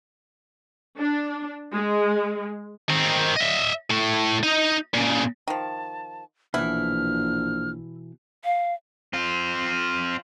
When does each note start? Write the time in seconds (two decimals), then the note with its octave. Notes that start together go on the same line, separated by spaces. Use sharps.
0.98 D4
1.73 G#3
2.90 D#3 C4
3.37 D#5 E5
3.90 A2 A3
4.43 D#4 D#5
4.94 A#2 C#3
5.48 D#3 F3 A5
6.54 A#1 B2 E3 E4 F6
8.45 F5
9.13 C4 F4